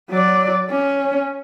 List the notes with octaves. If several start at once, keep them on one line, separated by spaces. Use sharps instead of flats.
F#3 D5
C#4